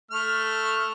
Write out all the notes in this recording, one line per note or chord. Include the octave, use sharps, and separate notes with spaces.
A3 F6